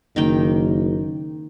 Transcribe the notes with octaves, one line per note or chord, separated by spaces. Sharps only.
F#1 D#3 A#3 G5